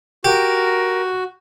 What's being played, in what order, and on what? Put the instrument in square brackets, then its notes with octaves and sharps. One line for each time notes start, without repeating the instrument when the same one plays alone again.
[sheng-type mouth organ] F#4 [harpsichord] G4 [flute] A#4